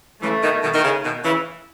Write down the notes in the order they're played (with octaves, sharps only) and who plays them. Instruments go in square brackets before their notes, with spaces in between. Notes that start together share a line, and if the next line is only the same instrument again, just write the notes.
[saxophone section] C#3 E3 [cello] A3
[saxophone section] B2 D#3
B2 D#3
D#3
C#3
B2 D#3
C#3 E3